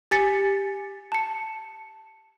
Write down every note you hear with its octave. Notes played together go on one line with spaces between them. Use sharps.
G4 G#5 A6 B6 C#7
A5 C#7